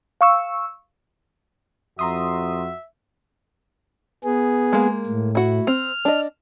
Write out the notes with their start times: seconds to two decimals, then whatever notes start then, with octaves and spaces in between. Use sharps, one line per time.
0.21 F5 C#6 E6
1.99 F2 F#4 E5 A#5 C6 D#6
4.24 B3 G#4
4.73 G#3 A#3
5.06 A2
5.35 E4 F#4
5.67 C4 F6
6.05 D4 D#5